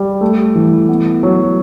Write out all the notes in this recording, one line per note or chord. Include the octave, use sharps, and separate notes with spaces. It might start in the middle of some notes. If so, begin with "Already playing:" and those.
Already playing: G3
A3
E3
B3
F#3